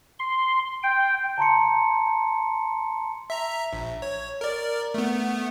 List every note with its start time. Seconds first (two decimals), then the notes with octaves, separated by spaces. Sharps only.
0.19 C6
0.83 G5
1.38 A5 A#5 C6 C#7
3.30 E5 A#5
3.73 A#1
4.02 C#5
4.41 A#4 D5
4.94 A3 B3